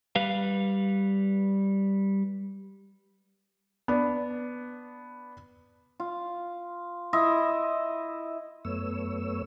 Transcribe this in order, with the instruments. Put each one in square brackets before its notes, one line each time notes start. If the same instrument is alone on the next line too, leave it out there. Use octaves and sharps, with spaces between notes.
[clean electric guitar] G3 B4 F5
[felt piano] B3 D4
[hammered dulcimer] F4
E4 D#5 E5 C6
[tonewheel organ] F#2 A3 B3 C#5 E6